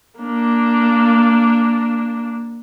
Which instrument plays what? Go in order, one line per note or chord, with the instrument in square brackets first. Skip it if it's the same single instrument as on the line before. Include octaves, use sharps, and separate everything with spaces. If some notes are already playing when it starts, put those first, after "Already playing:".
[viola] A#3 D4